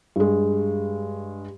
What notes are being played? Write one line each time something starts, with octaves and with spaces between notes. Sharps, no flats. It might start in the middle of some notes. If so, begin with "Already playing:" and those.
G2 G#3